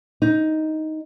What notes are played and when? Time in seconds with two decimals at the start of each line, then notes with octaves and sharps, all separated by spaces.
0.22 D#4